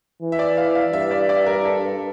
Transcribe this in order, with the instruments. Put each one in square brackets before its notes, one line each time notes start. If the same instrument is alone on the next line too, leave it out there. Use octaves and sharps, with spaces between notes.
[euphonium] E3
[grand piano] E5
D5
F5
F5
[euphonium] G2 [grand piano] E5
[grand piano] D5
D5
A#4
A4